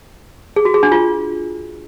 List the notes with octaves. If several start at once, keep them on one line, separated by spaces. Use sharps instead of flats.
G#4
F#4
G#4
D4
F4